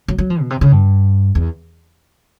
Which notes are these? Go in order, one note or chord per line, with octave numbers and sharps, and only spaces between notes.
F#3
F#3
F3
B2
C3
C#3
G2
E2